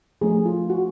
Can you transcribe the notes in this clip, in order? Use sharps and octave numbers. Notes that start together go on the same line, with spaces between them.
F3 A3 C#4 G#4
F4
F#4